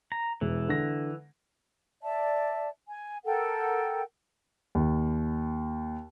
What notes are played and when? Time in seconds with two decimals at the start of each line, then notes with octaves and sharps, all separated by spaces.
0.12 A#5
0.41 E1 E3
0.69 D3 A#6
2.02 D5 E5 A5
2.88 G#5
3.25 A4 A#4 F#5 G5
4.75 D#2